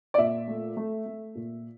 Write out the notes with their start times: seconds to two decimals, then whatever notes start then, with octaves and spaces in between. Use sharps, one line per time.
0.14 D5
0.18 A#2 E5
0.48 A3
0.77 A3
1.06 A3
1.35 A#2